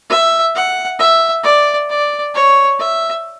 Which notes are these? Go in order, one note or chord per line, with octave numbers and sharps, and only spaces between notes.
E5
F#5
E5
D5
D5
C#5
E5